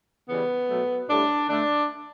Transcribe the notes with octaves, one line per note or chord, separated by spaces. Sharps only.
C#3 E3 G3 B3
B2 F#3 A3
A2 G3 D4
D3 A3 D4